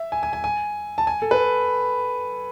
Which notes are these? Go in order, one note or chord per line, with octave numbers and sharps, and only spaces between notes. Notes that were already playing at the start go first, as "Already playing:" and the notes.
Already playing: E5
G#5
G#5
G#5
G#5
A5
G#5
A4
B4